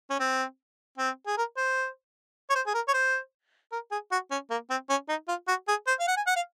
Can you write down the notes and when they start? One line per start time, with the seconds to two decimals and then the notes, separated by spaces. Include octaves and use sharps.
0.10 C#4
0.20 C4
0.98 C4
1.27 G#4
1.38 A#4
1.57 C5
2.50 C#5
2.55 C5
2.67 G#4
2.74 A#4
2.88 C#5
2.94 C5
3.72 A#4
3.92 G#4
4.12 F#4
4.31 C#4
4.51 A#3
4.70 C4
4.90 C#4
5.09 D#4
5.28 F4
5.48 F#4
5.68 G#4
5.87 C5
6.00 F5
6.08 F#5
6.17 G#5
6.27 F#5
6.36 F5